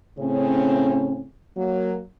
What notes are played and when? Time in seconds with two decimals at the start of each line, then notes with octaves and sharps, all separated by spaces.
0.18 A2 C#3 C4 C#4
1.55 F#3 A#3